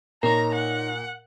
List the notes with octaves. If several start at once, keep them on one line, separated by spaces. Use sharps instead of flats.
A#2 D#4 A#4 C#5 A#5
F#5